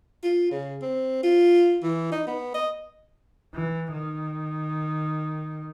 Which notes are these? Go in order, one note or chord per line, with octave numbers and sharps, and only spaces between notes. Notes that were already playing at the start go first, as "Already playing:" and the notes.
F4
C#3
C4
F4
E3
D#4
B3
D#5
E3
D#3